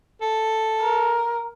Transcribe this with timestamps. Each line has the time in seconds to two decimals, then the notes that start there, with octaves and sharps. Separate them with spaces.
0.21 A4
0.80 A#4